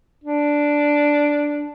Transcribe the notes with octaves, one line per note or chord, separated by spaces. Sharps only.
D4